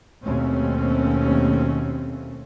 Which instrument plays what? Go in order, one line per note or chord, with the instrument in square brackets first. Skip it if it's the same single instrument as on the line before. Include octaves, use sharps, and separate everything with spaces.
[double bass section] D#2 B2 A3 C4 C#4